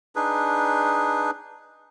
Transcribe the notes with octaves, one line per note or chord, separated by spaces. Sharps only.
D4 D#4 G#4 B4